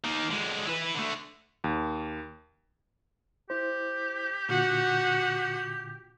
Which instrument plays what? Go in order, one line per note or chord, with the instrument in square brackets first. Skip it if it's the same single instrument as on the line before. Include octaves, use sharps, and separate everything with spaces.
[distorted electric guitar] D#3 A#3
D3 G#3
E4 B4
D3 A3
[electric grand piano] D#2
[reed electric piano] E4 C5 [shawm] G4
[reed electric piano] A#2 D3 F4 [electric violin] F#4 F#5